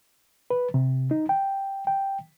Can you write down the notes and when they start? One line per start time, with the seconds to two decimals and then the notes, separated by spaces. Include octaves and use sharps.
0.50 B4
0.74 C3
1.11 D#4
1.29 G5
1.87 G5